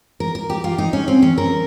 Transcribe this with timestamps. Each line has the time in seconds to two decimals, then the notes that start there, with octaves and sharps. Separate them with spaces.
0.20 A#4
0.35 A#4
0.50 G4
0.64 F4
0.78 D#4
0.93 C#4
1.08 C4
1.22 C#4
1.38 A#4